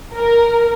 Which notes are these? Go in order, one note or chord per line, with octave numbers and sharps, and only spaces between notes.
A#4